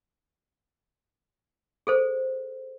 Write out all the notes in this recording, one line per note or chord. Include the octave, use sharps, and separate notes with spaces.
G#4 A4 C5